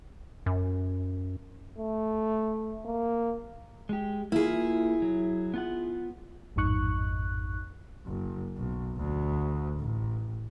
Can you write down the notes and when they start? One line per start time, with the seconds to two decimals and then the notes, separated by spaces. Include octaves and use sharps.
0.46 F#2
1.78 A3
2.85 A#3
3.89 G#3 G4
4.32 A#3 E4 F4 G#4
5.02 F#3
5.54 B3 F4 F#5
6.56 A1 F2 G#2 D#4 C#6 F#6
8.06 F#1
8.56 B1
8.97 D2
9.79 A1